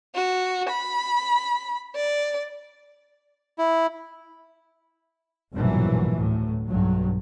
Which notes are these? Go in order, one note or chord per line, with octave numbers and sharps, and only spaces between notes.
F#4
B5
D5
E4
F1 A#1 G2 B2 E3 F#3
D2 A2 F#3
B1 G2 F#3